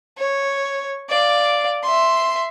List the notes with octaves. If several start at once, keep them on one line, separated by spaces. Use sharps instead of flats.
C#5
D5 F5
E5 C6